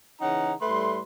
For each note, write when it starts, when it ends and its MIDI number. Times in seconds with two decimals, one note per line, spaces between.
0.21 0.53 49
0.21 0.53 52
0.21 0.53 61
0.21 0.53 63
0.21 0.53 78
0.21 0.53 82
0.62 1.00 45
0.62 1.00 55
0.62 1.00 57
0.62 1.00 71
0.62 1.00 84